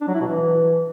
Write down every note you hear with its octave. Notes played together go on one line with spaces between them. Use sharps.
D4
F#3
E4
B2
E3